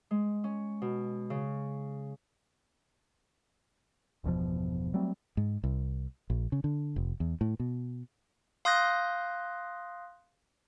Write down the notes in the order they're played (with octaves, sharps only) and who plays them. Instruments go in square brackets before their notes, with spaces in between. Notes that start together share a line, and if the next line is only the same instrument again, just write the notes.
[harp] G#3
C#4
B2
C#3
[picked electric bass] G1 E2 B2 F3
F#3 G3 A3 C4
[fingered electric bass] G#2
C2
A#1
C#3
D3
F1
E2
A2
B2
[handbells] F5 C6 D#6 F#6 G6 A#6